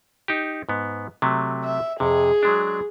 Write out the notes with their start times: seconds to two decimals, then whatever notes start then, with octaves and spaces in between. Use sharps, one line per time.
0.28 D#4 G4
0.69 G#2 B3
1.22 C3 F#3 A3
1.64 E5
2.00 F2 C3 G#4
2.43 F#3 G#3 D4